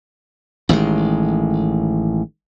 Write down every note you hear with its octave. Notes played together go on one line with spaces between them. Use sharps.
A1 D#3 G3 G#3